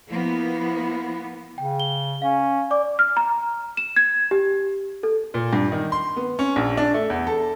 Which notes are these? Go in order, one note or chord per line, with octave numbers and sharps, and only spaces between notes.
F3 A#3 B3 E4
C#3 G5
G7
C#4 F5
D5 D6
F6
A#5
E7
G#6
G4
A4
A#2
G2
D#3
C6
B3
C#4
A#1
D4
A3
E2
A4